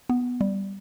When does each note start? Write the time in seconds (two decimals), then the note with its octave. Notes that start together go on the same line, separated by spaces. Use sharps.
0.09 B3
0.41 G3